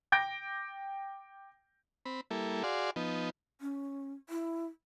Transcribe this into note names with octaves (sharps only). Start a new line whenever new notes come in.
G5 D6 G6 A#6 D7
C4 B5
G3 A#3 E4 A4
F#4 G#4 D5 F5 C6
F3 B3 D#4
C#4
E4